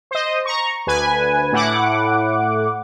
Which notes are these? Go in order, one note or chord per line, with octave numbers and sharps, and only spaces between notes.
C5 D#5
A#5 C#6
D2 B4 G#5
A2 E4 F#5 D6